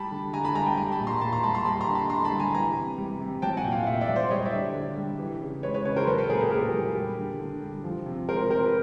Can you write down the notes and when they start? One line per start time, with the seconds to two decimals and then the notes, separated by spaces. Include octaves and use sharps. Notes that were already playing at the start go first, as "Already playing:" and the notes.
Already playing: G3 A5 B5
0.11 D3
0.33 D3 G#5 A#5
0.44 A5 B5
0.55 G3 G#5 A#5
0.66 G5 A5
0.77 G3 G#5 A#5
0.92 A5 B5
1.00 A#2
1.07 A#5 C6
1.21 A#2 A5 B5
1.32 A#5 C6
1.43 G3 A5 B5
1.55 A#5 C6
1.65 G3 A5 B5
1.81 A#5 C6
1.88 D3
1.95 A5 B5
2.10 D3 A#5 C6
2.24 A5 B5
2.32 G3
2.40 G#5 A#5
2.54 E3 G#5 A#5
2.76 C3
2.98 G3
3.21 C3
3.42 F#3 G5 A5
3.57 F#5 G#5
3.65 A#2
3.72 F5 G5
3.82 F5
3.86 A#2 E5 F#5
4.01 D5 E5
4.09 F#3
4.16 C5 D5
4.31 G3 C#5 D#5
4.45 D5 E5
4.53 D3
4.74 D3
4.97 G3
5.19 E3
5.41 C#3
5.63 G#3 B4 C#5
5.74 B4 C#5
5.85 C#3 B4 C#5
5.96 A#4 C5
6.07 F#3 A4 B4
6.18 A4 B4
6.29 A#2 G#4 A#4
6.40 G4 A4
6.51 A#2 G#4 A#4
6.74 F#3
6.95 G3
7.18 D3
7.40 D3
7.62 G3
7.84 F3
8.06 C3
8.28 G#3 A#4 C5
8.50 C3 A#4 C5
8.66 B4